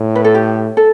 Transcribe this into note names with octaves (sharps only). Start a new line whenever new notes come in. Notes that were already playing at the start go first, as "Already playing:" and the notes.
Already playing: A2
B4
A4
G4
A4